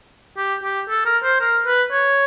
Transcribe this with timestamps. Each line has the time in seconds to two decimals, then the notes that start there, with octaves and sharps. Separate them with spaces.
0.37 G4
0.63 G4
0.89 A4
1.06 A#4
1.24 C5
1.40 A#4
1.66 B4
1.92 C#5